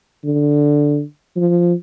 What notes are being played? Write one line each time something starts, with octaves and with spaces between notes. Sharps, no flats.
D3
F3